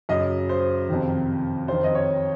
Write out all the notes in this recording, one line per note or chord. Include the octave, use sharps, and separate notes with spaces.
F#2 C#3 D#5
C5
F2 C3 D#3
F2 D#3 C5
D#5
C#5